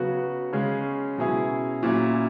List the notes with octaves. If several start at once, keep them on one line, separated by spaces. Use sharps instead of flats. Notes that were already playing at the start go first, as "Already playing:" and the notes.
Already playing: C#3 F#3 B3 F#4
C#3 G#3 C#4
B2 F#3 C#4 E4 G#4
A#2 F#3 C#4 E4